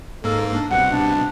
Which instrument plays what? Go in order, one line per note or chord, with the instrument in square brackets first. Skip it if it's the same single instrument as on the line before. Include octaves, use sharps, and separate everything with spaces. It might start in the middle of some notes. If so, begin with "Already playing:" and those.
[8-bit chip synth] G#2 A#3 [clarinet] A4
[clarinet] D4
[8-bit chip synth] C2 B2 [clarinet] F#5
[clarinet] D4